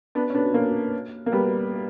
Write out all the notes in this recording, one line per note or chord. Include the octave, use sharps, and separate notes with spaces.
B3 D4
C#4
B3 D4
A#3 C#4
A#3
G3 B3